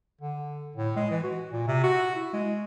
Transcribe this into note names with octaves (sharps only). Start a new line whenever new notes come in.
D3
A2
G#3
E3
F#4
A#2
C3
F#4
E4
G#3